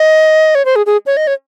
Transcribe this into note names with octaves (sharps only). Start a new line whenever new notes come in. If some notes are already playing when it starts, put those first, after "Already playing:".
Already playing: D#5
C#5
C5
G#4
G#4
C#5
D#5
C#5